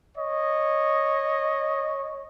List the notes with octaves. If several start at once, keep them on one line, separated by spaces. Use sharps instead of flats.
C#5 D#5